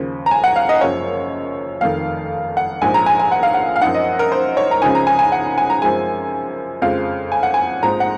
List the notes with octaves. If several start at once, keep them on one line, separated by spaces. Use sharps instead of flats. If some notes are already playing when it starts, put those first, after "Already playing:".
Already playing: D#2 C#3 F3
A#5
G#5
F#5
F5
D#5
F#1 F#2 F3 C#5
F1 F2 D#3 F5
F#5
A#1 G#2 F3 G#5
A#5
G#5
G#5
F#5
F5
F#5
F5
F#2 F3 C4 D#4 F#5
D#5
A#4
C5
C#5
A#5
C#2 C#3 F3 C4 D#4 G#5
A#5
G#5
G#5
F#5
G#5
A#5
F#2 F3 G#3 C4 G#5
F2 C#3 F3 G#3 F5
G#5
F#5
G#5
A#1 G#2 F3 C4 D#4 A#5
F#5